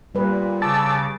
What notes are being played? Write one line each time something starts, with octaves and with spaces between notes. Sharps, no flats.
A#2 G3 B4
C#3 A5 D6 E6